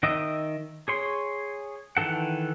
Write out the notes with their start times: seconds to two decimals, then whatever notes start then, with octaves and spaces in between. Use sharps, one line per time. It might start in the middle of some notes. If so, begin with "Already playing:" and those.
0.03 D#3 D#5 E5 D#6
0.88 G#4 C#5 C6
1.97 D#3 E3 A4 F#5